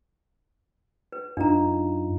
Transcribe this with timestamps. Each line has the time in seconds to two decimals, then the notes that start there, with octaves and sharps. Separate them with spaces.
1.12 B4
1.37 F#2 D4 D#4 F4 A#5